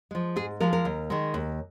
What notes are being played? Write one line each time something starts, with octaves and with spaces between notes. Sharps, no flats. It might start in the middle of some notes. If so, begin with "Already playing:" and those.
F3 G#3
G#2 G#4
F3 G#3 A#4
A#4
D#2
D#3 G#3
D#2